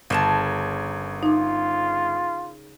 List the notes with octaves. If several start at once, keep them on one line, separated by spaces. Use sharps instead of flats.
G1 C#3 A#4 A5 E7
D#4 F4 D6